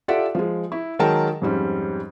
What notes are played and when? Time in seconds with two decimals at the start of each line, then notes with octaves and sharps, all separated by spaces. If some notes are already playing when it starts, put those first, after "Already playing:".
0.08 F4 G4 A4 D5 E5 F#5
0.35 F3 G#3
0.72 E4
0.99 D#3 F#3 G#3 A#4 G5 A5
1.42 F2 G#2 G3 C#4